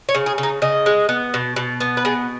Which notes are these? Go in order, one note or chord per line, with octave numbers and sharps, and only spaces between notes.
C#5
C#3
G#4
C#3
D#4
C#3 D#5
G#3
B3
B2
B2
B3
B4
B2 G#4